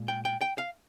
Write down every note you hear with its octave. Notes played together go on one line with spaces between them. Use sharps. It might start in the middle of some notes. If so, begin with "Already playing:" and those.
Already playing: A#2 G#3
G5
G5
G5
F5